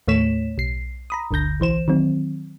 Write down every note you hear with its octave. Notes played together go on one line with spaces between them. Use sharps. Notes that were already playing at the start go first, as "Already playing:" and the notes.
D#2 A2 A3 C#5 B6 E7
B1 C7
A#5 B5 D#6
G1 D2 D3 G6 A#6
B1 E3 C5 E7
D#3 F#3 C4